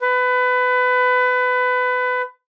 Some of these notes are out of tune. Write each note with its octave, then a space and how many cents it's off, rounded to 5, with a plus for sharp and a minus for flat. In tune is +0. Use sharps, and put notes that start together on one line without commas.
B4 +25